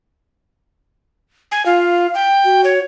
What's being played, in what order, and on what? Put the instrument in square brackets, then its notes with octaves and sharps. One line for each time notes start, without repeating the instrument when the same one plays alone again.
[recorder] G#5
[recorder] F4 [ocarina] F5
[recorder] G5
[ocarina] F#4
[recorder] C#5